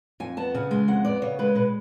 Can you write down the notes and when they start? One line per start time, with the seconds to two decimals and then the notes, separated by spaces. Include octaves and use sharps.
0.20 F2 G#5
0.37 B3 A5
0.55 C#3 G#5
0.71 G#3 G#5
0.88 F2 F#5
1.05 B3 D5
1.22 C#3 C#5
1.39 G#3 B4
1.55 B2 B4